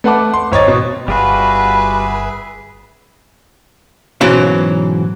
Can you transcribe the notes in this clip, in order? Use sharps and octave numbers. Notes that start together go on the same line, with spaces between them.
A3 B4 F#5 A5 D6
C6
G#1 C#5 D#5 A6
B2
G1 G3 F4 F#4 G#4 B4 E5
G#2 B2 E3 F#3 C#4 C5